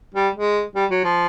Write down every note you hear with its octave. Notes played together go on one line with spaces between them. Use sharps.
G3
G#3
G3
F#3
F3